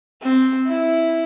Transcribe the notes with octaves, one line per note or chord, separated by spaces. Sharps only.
C4
E4